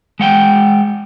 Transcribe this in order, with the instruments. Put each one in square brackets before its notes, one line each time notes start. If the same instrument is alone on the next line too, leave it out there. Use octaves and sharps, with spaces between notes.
[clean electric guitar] G#3 F#5 G5